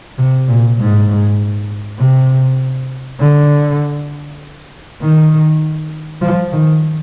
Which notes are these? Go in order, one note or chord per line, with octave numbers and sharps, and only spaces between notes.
C3
A#2
G#2
C3
D3
D#3
F3
D#3